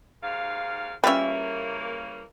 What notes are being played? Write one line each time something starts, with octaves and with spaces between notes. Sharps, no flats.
D#2 G#2 F5
C#3 E3 G3 A#3 C#4 F4 B4 E5